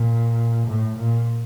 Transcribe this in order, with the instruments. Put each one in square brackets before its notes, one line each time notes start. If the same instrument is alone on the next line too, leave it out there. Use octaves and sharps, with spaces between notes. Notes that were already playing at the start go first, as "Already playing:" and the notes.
Already playing: [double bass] A#2
A2
A#2